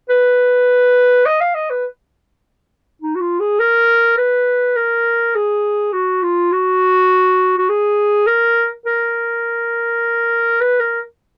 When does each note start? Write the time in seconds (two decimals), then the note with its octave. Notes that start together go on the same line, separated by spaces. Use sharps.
0.10 B4
1.26 D#5
1.40 F5
1.55 D#5
1.70 B4
3.02 D#4
3.15 F#4
3.21 F4
3.40 G#4
3.60 A#4
4.17 B4
4.76 A#4
5.35 G#4
5.93 F#4
6.23 F4
6.52 F#4
7.58 F#4
7.69 G#4
8.27 A#4
8.86 A#4
10.61 B4
10.80 A#4